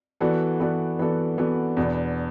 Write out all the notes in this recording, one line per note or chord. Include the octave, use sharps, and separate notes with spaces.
E3 B3 F#4 A4 D5
E3 B3 F#4 A4 D5
E3 B3 F#4 A4 D5
E3 B3 F#4 A4 D5
E2 B2 B3 D4